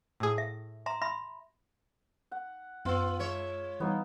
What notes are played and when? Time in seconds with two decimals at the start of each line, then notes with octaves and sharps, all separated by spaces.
0.20 A2 G#4
0.38 E5
0.86 E5 A#5 C6
1.02 E5 B5 C6
2.32 F#5
2.85 F#2 B3 F4 E6
3.19 G#3 C#5 E5
3.80 E3 G3 B3 D#4 F5